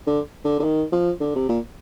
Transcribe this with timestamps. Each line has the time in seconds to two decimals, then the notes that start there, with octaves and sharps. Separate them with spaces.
0.07 D3
0.44 D3
0.59 D3
0.64 D#3
0.92 F3
1.20 D3
1.35 C3
1.49 A#2